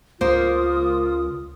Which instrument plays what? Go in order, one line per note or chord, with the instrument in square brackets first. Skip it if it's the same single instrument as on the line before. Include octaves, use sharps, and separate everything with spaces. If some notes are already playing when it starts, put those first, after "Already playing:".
[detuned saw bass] C#2 [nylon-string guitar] A#3 C5 [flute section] F4 A#4 D#6